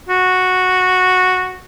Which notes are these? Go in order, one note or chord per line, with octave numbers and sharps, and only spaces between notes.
F#4